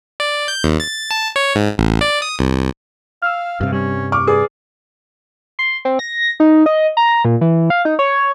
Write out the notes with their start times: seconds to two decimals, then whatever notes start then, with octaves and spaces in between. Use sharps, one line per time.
0.20 D5
0.48 G6
0.64 D#2
0.80 A6
1.11 A5
1.36 C#5
1.55 G#2
1.78 A1
2.01 D5
2.22 D#6
2.39 C2
3.22 F5 E6 F6
3.61 G2 C3 F5
3.73 G3 C#4
4.12 C#6 D6 F6
4.27 G#4 B4 D5
5.59 C6
5.85 C4
5.99 A#6
6.40 D#4
6.66 D#5
6.97 A#5
7.25 A#2
7.41 E3
7.70 F5
7.85 D#4
7.99 C#5